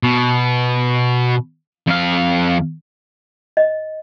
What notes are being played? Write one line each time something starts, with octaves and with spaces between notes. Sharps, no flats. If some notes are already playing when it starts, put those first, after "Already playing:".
B2
F2 F5
D#5